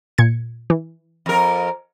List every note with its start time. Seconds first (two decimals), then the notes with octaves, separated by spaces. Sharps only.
0.18 A#2 G#6 C#7
0.70 E3
1.26 F2 A#4